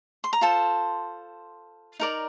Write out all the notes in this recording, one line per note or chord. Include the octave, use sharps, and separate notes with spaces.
C6
A#5
F4 A4 C5 A5
D#4 A#4 D5